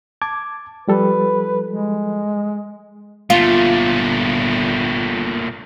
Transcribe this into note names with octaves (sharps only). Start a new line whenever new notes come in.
A5 D6 G#6
F3 G3 A4 B4
G#3
G1 A#2 A3 F4